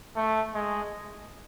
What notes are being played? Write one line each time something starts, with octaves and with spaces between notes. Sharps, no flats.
A3
G#3